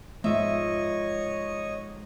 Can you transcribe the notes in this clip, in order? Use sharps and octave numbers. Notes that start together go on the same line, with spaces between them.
G#2 F3 F4 C#5 D#5 E5